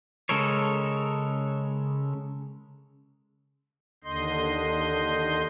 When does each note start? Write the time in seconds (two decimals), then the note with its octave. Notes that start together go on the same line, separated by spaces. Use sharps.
0.29 C#3 G#3 A4 A#4 C#5
4.04 D#2 D3 D#5 C6 G6